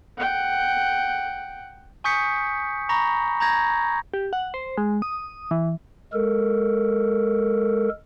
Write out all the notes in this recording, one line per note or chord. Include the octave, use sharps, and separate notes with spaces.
F#5 G5
G#5 C#6 D#6 G6 B6 C#7
A#5 B5 C#6 A#6
A#5 B5 G6 G#6 A#6
G4
F#5
C5
G#3
D#6
E3
G#3 A4 A#4